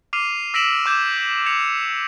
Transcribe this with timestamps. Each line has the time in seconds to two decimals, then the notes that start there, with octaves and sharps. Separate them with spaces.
0.13 D6 F6 C7 D#7 F7
0.54 E6 A#6 B6 D7 E7 F#7
0.86 D6 G6 G#6 E7
1.46 G#6 C#7 F7